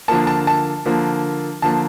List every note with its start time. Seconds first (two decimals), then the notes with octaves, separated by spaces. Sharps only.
0.08 D3 F3 A#3 A5
0.27 A5
0.47 A5
0.85 D3 F3 A#3
1.62 D3 F3 A#3 A5